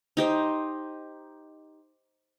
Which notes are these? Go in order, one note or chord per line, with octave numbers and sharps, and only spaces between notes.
D#4 G4 C5 D#5